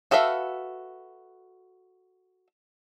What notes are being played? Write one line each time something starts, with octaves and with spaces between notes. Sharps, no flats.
F#4 A4 B4 E5 F5